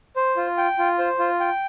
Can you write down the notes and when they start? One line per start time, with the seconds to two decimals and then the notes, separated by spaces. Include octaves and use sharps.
0.16 C5
0.37 F4
0.58 G5
0.78 F4
0.98 C5
1.19 F4
1.40 G5